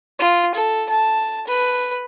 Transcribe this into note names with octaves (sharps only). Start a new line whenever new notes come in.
F4
A4
A5
B4